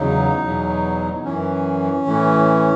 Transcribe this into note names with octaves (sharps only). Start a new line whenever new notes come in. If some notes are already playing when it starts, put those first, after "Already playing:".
Already playing: E2 C#3 F#3 D#4
E2 B2 F#3
F#2 E3 C#4
A2 E3